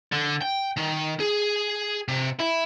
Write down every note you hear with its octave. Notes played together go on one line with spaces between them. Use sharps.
D3
G5
D#3
G#4
C3
E4